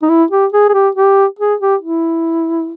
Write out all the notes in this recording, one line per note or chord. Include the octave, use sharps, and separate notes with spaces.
D#4
E4
G4
G#4
G#4
G4
G4
G#4
G4
E4